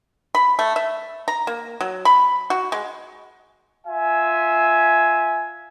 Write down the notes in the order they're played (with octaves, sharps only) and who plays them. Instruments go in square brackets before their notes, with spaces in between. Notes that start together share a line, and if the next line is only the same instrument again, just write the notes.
[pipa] B5
A3
E5
A#5
A#3
F#3
B5
F#4
G#3
[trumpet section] F4 E5 G#5